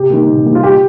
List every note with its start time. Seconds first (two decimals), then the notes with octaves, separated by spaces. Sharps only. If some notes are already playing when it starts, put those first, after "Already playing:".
Already playing: C3 G4
0.10 D#3 G3 A#3
0.27 C3
0.46 D#3 G3 A#3
0.55 F4
0.63 G4